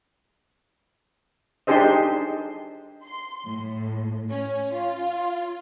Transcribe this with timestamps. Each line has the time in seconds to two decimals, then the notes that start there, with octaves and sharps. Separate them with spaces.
1.67 D4 D#4 G4 G#4 C5 D#5
3.05 C6
3.46 A2
4.30 C#4
4.74 F4